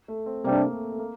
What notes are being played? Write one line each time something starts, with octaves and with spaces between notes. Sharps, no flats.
A3
C4
C3 G3 A#3 D4
A#3
A3
A3
A#3